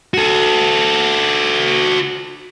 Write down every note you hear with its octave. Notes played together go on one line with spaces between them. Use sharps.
F#4 A4